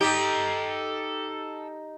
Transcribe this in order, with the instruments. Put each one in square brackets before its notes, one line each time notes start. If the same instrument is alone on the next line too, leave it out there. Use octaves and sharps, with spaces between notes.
[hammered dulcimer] D#4 [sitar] G4 [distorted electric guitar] A4 G5